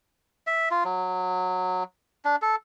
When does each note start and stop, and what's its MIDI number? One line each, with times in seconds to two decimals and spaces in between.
0.47 0.69 76
0.71 0.84 65
0.85 1.83 54
2.25 2.36 62
2.42 2.56 69